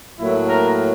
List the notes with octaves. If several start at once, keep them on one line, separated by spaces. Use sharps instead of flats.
A2 F#3 A#3 E4
A#4